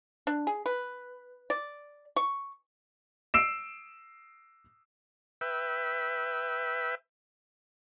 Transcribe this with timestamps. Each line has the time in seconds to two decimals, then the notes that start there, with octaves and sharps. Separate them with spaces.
0.27 D4
0.47 G#4
0.66 B4
1.50 D5
2.16 C#6
3.34 E6 C7 D7 E7
5.41 B4 E5 G5